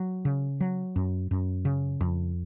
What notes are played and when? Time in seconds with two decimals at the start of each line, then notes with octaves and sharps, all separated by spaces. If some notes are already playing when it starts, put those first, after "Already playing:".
Already playing: F#3
0.25 C#3
0.61 F#3
0.96 F#2
1.31 F#2
1.65 C#3
2.01 F2